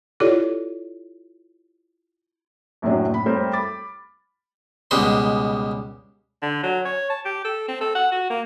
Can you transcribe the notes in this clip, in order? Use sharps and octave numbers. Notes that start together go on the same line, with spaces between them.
E4 F4 G4 A4 C#5 D5
F#2 A2 C3 F#3 D4
A2 B5
G3 A3 C4 A#4 C5 C#5
B5 D6 A6
C#2 B2 G3 G#3 B5 C6
D3
F#3
C#5
A5
G4
A4
C4
A4
F#5
F#4
A#3